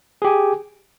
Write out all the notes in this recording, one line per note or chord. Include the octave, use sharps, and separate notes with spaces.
G4 G#4 G#5